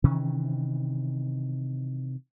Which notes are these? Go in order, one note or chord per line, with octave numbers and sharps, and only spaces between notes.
C3 D#3 E3 C#4